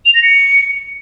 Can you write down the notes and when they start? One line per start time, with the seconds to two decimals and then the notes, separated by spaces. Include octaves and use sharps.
0.05 F7
0.14 A#6
0.23 C#7